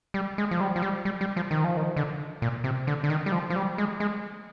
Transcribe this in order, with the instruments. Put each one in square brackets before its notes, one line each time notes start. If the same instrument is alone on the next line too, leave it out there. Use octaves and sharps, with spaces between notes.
[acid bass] G3
G#3
F3
G3
F3
G3
G3
G3
F3
D#3
F3
D#3
D3
A#2
C3
D3
D3
D#3
G3
F3
F3
G3
G#3
G#3